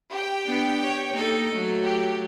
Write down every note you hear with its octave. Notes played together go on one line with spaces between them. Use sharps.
G4 G5
B3 D4
C#5
A#3 D#4 A4
F#3 A3
G4